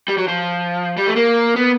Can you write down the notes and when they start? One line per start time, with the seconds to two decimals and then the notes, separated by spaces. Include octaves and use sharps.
0.08 G3
0.18 F#3
0.28 F3
0.97 G3
1.07 A3
1.16 A#3
1.56 B3